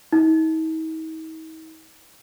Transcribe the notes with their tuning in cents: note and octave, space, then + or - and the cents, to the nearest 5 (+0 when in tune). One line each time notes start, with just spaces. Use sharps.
D#4 +45